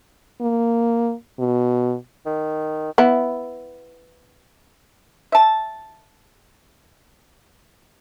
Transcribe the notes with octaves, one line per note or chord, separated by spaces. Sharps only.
A#3
B2
D#3
B3 E4
E5 A5